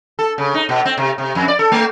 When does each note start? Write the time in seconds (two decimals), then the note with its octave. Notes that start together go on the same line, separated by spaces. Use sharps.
0.19 A4
0.38 C#3
0.54 D#4
0.69 B2
0.85 C4
0.98 C3
1.18 C3
1.35 F2
1.48 D5
1.59 A4
1.72 A3